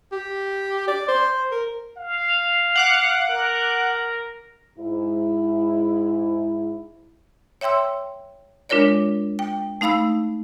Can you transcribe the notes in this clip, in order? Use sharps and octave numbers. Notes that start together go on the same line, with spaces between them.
G4
D5
C5
A#4
F5
F#5 D6 F#6
A#4
G#2 E4
C#5 E5 G5 C6 E6
G#3 D4 F4 A#4 C#5 D5
G5
A3 D#4 F5 B5 E6